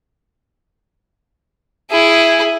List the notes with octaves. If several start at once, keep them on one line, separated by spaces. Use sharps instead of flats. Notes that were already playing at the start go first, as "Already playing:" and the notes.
E4 G#4